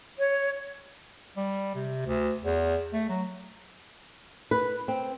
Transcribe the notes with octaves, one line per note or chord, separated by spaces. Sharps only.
C#5
G3
C3
D2
E2
A3
F#3
B4
C4